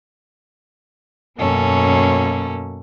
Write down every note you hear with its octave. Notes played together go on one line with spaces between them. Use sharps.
F#2 B2 A#3 C#4 A4